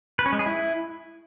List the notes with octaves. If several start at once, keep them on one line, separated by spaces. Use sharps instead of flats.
B4
C#4
G#3
G#4
E4